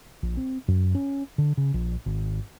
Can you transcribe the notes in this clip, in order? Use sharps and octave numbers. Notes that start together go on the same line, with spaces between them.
A#1
C4
F#2
C#4
D3
C#3
A#1
G#1